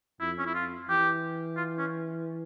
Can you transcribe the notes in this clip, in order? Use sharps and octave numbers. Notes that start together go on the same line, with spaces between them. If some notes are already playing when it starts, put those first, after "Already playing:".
F2 E4
C#4
E4
F4
E3 G4
F4
C#4